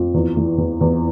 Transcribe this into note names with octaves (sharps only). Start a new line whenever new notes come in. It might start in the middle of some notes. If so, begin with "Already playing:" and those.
Already playing: F2
E2
E3
E2
E2